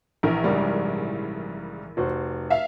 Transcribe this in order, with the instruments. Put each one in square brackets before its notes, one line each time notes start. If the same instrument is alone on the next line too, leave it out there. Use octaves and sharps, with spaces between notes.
[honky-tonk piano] A#1 E3 A#4
[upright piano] G#2 C#3 G3
F1 F#4 C5
[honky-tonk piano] E5 F5